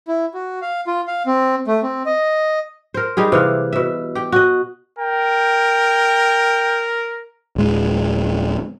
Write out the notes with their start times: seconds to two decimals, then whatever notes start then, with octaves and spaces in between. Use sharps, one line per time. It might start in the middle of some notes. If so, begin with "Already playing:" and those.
0.08 E4
0.34 F#4
0.62 F5
0.87 F4
1.07 F5
1.26 C4
1.67 A3
1.83 C4
2.06 D#5
2.94 A#4 C5
3.17 G3 D#4 G4 G#4
3.32 C3 E3 F5
3.73 B2 E5
4.15 G4 G5
4.32 F#4 D#5
4.99 A#4 G5
7.56 D1 G#3